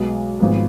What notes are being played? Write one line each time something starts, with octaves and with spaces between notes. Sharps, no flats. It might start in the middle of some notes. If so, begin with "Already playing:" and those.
Already playing: B1 B2 G#3 B3
G#1 G#2 F3 B3